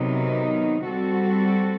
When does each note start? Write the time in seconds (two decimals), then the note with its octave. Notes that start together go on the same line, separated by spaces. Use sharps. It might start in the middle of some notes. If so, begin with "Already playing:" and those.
Already playing: C3 D#3 F#3 B3 D#4
0.85 G3 C4 F#4 A4